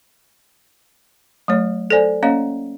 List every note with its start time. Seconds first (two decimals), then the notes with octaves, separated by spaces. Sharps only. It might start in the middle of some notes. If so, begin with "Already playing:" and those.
1.48 F#3 A3 C#5
1.90 A4 C5 D5 G#5
2.23 A#3 C#4 C#5 D#5 F5